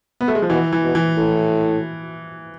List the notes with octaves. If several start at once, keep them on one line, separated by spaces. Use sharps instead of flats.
B3
A3
G#3
F3
B2 E3
E3
B2
E3
A2